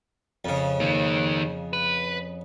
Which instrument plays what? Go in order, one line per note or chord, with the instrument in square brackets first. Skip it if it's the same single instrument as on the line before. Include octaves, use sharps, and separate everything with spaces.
[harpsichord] F2 C#3
[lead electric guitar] D#3 A#3
B4